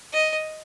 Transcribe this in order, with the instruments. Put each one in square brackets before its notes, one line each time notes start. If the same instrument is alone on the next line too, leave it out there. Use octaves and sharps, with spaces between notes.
[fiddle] D#5